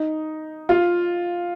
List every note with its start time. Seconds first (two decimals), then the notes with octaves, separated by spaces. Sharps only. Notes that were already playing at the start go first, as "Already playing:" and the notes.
Already playing: D#4
0.69 F4